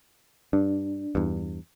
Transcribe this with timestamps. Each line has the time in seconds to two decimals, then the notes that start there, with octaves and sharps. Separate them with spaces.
0.53 G2 D4
1.15 E2 G2